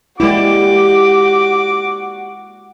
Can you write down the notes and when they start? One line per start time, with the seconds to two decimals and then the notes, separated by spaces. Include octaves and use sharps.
0.20 G#3 A#3 E4 F#4 G4 D5 D6